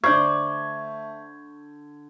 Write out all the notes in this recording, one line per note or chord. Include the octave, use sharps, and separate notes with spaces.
D3 A3 C5 D5 C#6 G6 G#6